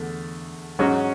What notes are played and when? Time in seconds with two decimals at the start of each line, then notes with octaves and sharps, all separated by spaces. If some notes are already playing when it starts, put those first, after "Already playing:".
Already playing: E2 D3 A3
0.79 G#2 F#3 C#4 F#4